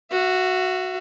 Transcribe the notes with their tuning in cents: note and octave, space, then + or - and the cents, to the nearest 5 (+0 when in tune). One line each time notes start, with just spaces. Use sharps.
F#4 +0 E5 +35